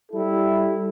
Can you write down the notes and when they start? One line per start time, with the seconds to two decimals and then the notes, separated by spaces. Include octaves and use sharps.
0.12 G3 E4 A4